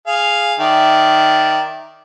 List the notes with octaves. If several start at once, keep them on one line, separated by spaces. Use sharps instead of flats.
G#4 F5
D#3 D5 E5